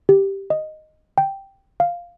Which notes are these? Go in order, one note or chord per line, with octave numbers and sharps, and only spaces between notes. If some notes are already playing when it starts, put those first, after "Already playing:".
G4
D#5
G5
F5